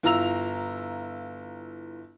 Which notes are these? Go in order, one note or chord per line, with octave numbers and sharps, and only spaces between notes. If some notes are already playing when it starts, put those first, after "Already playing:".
G1 E4 F4 A#5 E6 F7